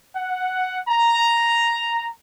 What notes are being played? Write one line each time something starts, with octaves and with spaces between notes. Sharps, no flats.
F#5
A#5